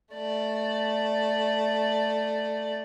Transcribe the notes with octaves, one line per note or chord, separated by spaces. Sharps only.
A3 D5